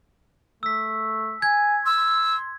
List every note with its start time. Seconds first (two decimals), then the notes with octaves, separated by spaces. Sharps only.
0.63 A3 E6 B6
1.42 G#5 G#6
1.86 C6 E6